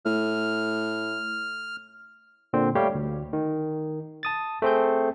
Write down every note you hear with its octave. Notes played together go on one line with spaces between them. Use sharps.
A2 F6
A#2 D3 C4 C5
G3 A3 G4 C#5 F5
D2
D#3
A5 D#6 A6
A3 C4 G#4 G6